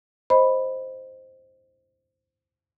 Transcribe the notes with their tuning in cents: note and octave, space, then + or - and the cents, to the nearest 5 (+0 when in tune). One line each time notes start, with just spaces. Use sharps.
C5 +0 D#5 +0 B5 +0